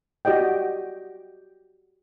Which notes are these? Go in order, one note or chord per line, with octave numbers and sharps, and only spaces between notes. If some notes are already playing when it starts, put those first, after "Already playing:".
F#4 G4 D5 D#5 G5